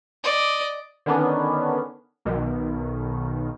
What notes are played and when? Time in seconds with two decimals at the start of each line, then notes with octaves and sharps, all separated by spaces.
0.24 D5 D#5
1.06 D3 D#3 B3 C#4 D4
2.25 B1 B2 D#3